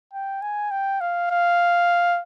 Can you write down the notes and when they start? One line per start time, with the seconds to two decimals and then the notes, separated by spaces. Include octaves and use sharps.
0.13 G5
0.42 G#5
0.71 G5
1.00 F5
1.31 F5